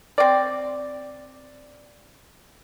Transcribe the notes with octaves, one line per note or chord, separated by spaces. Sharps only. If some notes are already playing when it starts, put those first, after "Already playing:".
C4 D5